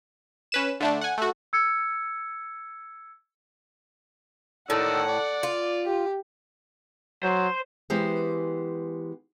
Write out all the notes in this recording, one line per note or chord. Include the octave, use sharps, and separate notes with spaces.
C#4 B4 E7
D3 A3 D4
F#5 G#5
A3 F#4
E6 G#6 C#7
A2 D#3 D5 F#5 E6
D5
F4
G4
F#3 C5 C6
E3 G#3 B3 G4 C5